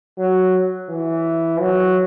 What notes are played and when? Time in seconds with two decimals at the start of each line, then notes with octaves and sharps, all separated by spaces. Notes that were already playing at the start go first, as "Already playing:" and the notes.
0.18 F#3
0.89 E3
1.60 F#3